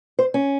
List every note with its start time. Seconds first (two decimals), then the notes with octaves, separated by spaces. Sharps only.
0.19 C5
0.34 C#4